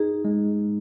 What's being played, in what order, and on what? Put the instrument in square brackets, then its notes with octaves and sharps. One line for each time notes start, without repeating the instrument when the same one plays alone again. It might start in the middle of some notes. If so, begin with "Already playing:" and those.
Already playing: [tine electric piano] D#4 [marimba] G#4
[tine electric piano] G#3